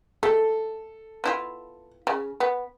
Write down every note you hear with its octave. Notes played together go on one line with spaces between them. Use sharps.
A3 A4
B3 E4 F4
C#3
B3